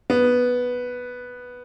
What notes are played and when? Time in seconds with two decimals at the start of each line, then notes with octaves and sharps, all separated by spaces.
0.10 B3